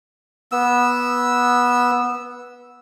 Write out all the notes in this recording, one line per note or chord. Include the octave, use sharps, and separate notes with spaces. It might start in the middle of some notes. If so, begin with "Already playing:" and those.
B3 E6